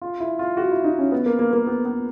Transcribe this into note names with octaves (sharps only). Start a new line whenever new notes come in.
F4
E4
F4
F#4
E4
D#4
C#4
B3
A#3
A#3
A#3
B3
B3